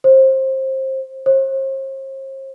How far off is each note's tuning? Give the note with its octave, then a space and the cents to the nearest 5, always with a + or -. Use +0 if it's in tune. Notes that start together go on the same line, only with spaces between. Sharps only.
C5 +25
C5 +45